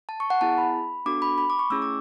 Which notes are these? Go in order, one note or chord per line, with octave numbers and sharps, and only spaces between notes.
A5
C#6
F#5
B3 E4 G#4 A5
B5
B3 D4 F#4 A4 D6
B5
B5
D6
C#6
A3 C#4 E4 G#4 E6
D6